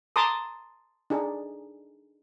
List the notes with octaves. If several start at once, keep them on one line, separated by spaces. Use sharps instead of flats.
A5 A#5 C6 D6 D#6
D4 D#4 G#4